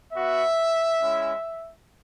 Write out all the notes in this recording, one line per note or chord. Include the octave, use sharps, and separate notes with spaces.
B3 F#4 E5
G#3 C#4 E4